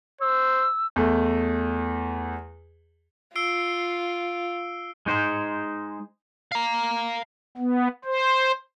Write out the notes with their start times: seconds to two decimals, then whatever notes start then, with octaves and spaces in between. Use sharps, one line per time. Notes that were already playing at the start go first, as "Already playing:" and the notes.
0.21 C5 E6
0.96 E2 A3
3.36 F4 E6 C7 D7
5.06 G#3 D#4 C5
6.52 F5 A#5
7.58 B3
8.05 C5